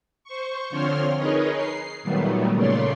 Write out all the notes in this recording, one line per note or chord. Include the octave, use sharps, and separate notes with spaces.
C5 C#6
D3 F3 C4 C#5 C6 F6
D#4 G#4 A#4 B4 C#5 D#5
C7
A#2 D#3 F#3 G3 A3 B3
A#2 C#3 A3 C#5 D5 C6